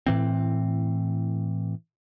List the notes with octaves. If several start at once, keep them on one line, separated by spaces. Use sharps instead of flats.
A2 E3 C4